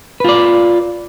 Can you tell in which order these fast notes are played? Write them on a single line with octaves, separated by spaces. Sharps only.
B4 F4 D5